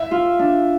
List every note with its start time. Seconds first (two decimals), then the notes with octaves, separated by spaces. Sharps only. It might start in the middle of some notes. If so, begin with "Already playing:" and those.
Already playing: E5
0.11 F4
0.39 D4